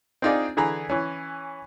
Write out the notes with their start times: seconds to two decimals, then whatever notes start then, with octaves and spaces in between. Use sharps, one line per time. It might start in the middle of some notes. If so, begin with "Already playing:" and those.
0.22 C4 D4 D#4 F4 G#4 D5
0.57 D3 E3 G#4 A#5 B5
0.90 E3 C#4